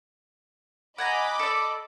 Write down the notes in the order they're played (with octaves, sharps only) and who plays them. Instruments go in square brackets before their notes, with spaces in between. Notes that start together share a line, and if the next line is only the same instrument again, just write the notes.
[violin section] D#5 B5 D6 [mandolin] F#5 G#5 A#5
[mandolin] A4 D5